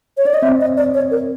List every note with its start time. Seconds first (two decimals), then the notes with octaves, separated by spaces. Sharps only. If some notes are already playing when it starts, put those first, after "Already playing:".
0.18 C#5
0.26 D5
0.34 D#5
0.42 C4 E5
0.61 D#5
0.77 D5
0.94 C#5
1.11 A#4